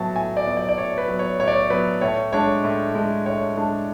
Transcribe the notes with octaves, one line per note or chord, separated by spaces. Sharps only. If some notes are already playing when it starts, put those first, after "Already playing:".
Already playing: A2 F#3 B3 A5
A2 G#5
D5
F#3 B3
D5
D5
A2 C#5
B4
F#3
B3
C#5
A2 C#5
D5
C#5
F#3 B3 B4
A2 C#5
G#3 D4 C#5
A2
G#3 D4
A2 C#5
G#3 D4